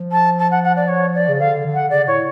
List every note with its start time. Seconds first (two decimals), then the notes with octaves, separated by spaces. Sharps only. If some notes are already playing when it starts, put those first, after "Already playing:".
Already playing: F3
0.12 A5
0.39 A5
0.51 F#5
0.63 F#5
0.76 D5
0.88 C#5
1.14 D5
1.29 C#3
1.40 D3 F5
1.66 D3
1.74 F#5
1.90 C#3 D5
2.07 A2 C#5